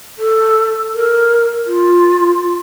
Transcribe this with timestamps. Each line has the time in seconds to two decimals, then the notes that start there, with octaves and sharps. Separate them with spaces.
0.19 A4
0.94 A#4
1.67 F4